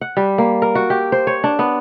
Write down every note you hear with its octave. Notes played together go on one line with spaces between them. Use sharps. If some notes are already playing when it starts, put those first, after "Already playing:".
F#5
G3
A#3
A#4
F#4
G4
C5
C#5
D4
B3